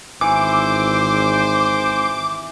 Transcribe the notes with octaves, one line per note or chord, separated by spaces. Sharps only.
G#1 E3 C5 D6